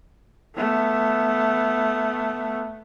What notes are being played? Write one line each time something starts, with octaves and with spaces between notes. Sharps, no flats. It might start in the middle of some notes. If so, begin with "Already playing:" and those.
A3 B3